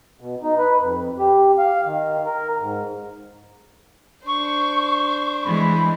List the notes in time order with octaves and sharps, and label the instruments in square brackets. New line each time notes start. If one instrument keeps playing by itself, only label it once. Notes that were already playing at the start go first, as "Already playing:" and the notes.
[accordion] B2
D#4
B4
F2
G4
F5
D#3
A#4
G#2
[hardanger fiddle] D4 C5 [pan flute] C#6
[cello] E3 G#3 [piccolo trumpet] B5